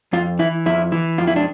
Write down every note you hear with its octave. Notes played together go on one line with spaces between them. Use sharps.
F2 F4
E3 E4
F2 E4
E3
F2 F4
E4
D4